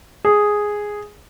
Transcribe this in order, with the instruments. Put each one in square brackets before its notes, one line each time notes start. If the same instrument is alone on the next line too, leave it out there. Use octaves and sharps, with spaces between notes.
[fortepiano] G#4